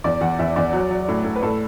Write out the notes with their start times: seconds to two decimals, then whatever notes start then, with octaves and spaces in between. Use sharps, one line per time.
0.04 E2 D5
0.21 E2 F#5
0.39 E2 E5
0.56 E2 D5
0.73 F#3
0.91 F#3
1.08 A2
1.24 A2
1.35 B4
1.42 A2 A4